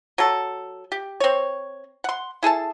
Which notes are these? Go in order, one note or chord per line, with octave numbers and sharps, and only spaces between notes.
F#3 A4
G4
C4 C#5
F#5 C6
E4 G#4 A4 A5